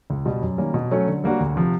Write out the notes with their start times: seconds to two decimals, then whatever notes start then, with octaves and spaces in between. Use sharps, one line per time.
0.10 C#2
0.25 B2 G3
0.42 F#2
0.58 D#3 G3 A#3 C#4
0.74 B2
0.91 F#3 A3 C#4
1.08 D3
1.24 G3 A#3 D4 F#4
1.40 D2
1.56 C3 F3